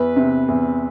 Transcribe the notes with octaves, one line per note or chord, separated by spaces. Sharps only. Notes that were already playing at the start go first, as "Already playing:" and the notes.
Already playing: E2 B4
C3
E2